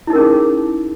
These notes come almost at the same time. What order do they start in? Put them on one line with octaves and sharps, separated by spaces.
E4 D#4 A#4 C#4 G#4